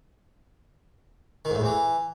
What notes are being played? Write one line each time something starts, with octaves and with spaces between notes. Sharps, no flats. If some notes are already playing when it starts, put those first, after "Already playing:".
D#3
G#2
A2
E2
E3